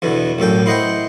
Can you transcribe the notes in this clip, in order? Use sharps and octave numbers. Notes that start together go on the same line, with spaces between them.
E2 B2 D3 E3
A1 F#2 A4 G5
E4 C5 D#5 F#5 G5